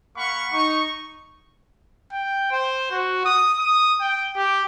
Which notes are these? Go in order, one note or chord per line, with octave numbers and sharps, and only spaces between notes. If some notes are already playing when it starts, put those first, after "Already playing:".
A#3 F5 F#5 B5 C#6
D#4 C#6
G5
C5
F#4
D#6
D#6
G5
G4